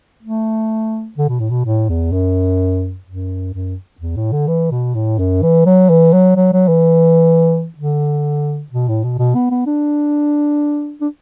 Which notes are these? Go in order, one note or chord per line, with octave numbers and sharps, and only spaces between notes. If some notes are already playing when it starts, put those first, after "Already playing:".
A3
D3
B2
A2
B2
A2
E2
F#2
F#2
F#2
E2
A2
D3
E3
B2
A2
F#2
E3
F#3
E3
F#3
F#3
F#3
E3
D3
B2
A2
B2
B2
B3
B3
D4
D4